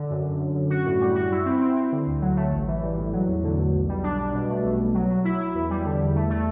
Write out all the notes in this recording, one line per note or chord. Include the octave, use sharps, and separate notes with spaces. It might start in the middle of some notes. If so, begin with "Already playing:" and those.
Already playing: D3
F#2
F#2
F#2
F#2
F#4
A2
G3
F#4
E4
C4
C4
C4
D3
D2
F#3
A3
A1
E3
G3
A2
F#3
E2
D3
E2
B1
G3
D4
G3
B2
A3
B1
B1
F#3
F#3
E4
E4
E2
G3
D3
E2
A3
A3